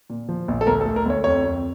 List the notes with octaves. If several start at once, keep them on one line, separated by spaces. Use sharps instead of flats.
A#2
F3
A#1
A4
D2 A#4
A4
A3
A#4
D2 C#5
F2 C#5
F2